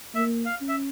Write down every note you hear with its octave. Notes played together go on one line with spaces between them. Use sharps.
A#3 E5
F5
C#4
E5